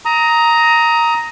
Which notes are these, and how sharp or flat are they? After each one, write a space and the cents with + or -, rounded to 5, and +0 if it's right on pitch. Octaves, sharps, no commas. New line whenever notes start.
A#5 +0 D#6 +25